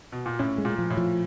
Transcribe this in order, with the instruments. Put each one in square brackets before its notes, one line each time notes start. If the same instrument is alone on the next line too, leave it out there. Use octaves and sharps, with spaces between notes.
[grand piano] B2
A#2
[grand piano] A2 [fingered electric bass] C#4
[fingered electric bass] G#3
[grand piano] A#2
[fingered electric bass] F3
[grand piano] A2
[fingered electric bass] F3